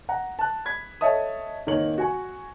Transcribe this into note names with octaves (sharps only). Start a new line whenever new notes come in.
F#5 A#5
A5 F#6
B5 G#6 B6
A4 C#5 D#5 E5 A5 D#6
D1 D#3 A#3 A#4 C#5 F#7
F#4 G#5 C#6